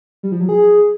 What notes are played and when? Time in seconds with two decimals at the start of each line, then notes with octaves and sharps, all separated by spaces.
0.23 G3
0.32 F3
0.40 F#3
0.49 G#4